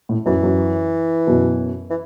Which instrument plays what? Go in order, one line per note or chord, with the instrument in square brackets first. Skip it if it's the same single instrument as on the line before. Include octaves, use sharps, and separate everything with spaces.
[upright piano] A2
[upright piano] F#2 [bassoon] E3
[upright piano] F#2
F#2 B2
[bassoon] E3